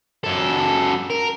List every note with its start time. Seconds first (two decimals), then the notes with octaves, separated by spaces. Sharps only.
0.24 F#2 A4
1.10 A#4